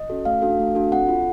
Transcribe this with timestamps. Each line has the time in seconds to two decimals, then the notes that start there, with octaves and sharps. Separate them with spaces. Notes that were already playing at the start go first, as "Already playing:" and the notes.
Already playing: D#5
0.10 C#4 F#4 A4
0.25 A3 F5
0.42 D4 F#4 A4
0.59 A3
0.75 D4 F#4 A4
0.92 C4 F#5
1.09 F4 A4